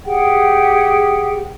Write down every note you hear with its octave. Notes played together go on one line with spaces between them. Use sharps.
G4 G#4 F#5 G5